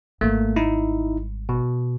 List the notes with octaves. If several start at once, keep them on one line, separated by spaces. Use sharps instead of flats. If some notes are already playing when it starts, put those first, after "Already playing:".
G#1 G3 A3 A#3
D#4 E4
B2